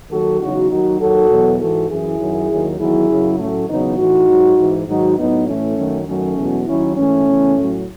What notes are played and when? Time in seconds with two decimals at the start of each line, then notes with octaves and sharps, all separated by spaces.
0.11 D#2 D#3 F#3 F#4 A4
0.41 E2 C#3 F#3 D#4 F#4
0.70 D#2 D#3 F#3 D#4 F#4
1.00 D#2 D#3 F#3 F#4 A4
1.30 E2 B2 F#3
1.60 G#2 E3 F#4 A4
1.90 F#2 E3 E4 G#4
2.20 F#2 D#3 F#3
2.50 D#2 D#3 F#3
2.79 E2 D#3 F#3 E4 G#4
3.09 F#2 C#3 F#3
3.39 A2 F#3 A3 C#4
3.69 E2 C#3 F#3 B3 D#4
3.98 A2 E3 D#4 F#4
4.28 G#2 F#3
4.58 G#2 E3
4.88 G#2 D#3 F#3 D#4 F#4
5.18 A2 F#3 B3 D#4
5.47 A2 E3 A3 C#4
5.78 F#2 D#3 F#3
6.07 F#2 D#3 F#3 A3 C#4
6.37 E2 B2 F#3
6.67 D#2 D#3 F#3 C#4 E4
6.97 G#2 E3 A3 C#4
7.27 E2 C#3 E3
7.56 A2 F#3